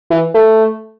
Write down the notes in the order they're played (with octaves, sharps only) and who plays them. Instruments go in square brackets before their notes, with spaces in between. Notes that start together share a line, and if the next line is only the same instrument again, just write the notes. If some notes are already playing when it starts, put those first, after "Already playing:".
[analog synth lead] E3
A3